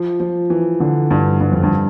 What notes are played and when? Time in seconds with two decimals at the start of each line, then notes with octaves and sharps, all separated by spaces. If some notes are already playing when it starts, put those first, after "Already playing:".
Already playing: F3
0.20 F3
0.50 E3
0.80 D3
1.11 G2
1.40 G2
1.52 F2
1.63 G2